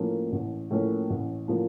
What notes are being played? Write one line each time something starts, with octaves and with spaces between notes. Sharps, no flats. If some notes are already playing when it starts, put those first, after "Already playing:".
Already playing: A2 F3 A#3 C#4
A1
A2 F3 A#3 C#4
A1
A2 F3 A#3 C#4